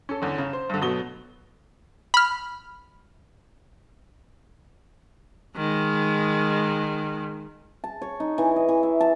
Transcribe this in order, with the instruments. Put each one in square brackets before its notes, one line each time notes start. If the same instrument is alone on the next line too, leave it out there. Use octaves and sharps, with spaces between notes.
[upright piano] C#4 A4
E2 D3 C#4
C#3
C5
G2 D3
B2 F#3 A3 B3 D#6 G7
[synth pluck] B5 F6
[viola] D#3 G#3
[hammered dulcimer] A5
C#5
D#4
E3
D#5
E3
E5
A5